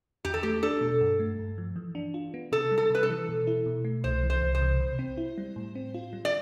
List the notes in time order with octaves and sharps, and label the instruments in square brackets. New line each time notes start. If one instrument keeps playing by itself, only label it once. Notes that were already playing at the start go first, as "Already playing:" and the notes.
[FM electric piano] E2 [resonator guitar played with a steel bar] G4
[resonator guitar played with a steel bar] A4
[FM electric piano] A3 [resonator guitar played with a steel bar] G4
[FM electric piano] D4 [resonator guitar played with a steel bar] A4
[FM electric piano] B2
G2
A3
G2
F3
E3
D4
F4
B3
[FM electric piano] C3 [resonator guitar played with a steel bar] A4
[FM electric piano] G3
[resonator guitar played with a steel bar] A4
[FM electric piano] C3 [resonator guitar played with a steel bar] B4
[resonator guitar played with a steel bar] A4
[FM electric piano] E3
B2
E4
B2
A3
[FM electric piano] C2 [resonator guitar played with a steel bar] C5
[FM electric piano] E3
[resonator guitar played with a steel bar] C5
[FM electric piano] C2
[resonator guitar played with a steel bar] C5
[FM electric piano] C3
C3
C4
E4
G3
A2
C4
F4
G3
[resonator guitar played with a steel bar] D5